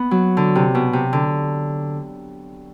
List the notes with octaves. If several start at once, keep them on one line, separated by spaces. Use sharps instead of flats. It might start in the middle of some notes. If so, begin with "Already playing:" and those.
Already playing: B3
F#3
D3
C3
B2
C3
D3